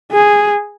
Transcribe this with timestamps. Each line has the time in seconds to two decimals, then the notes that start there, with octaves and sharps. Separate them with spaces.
0.12 G#4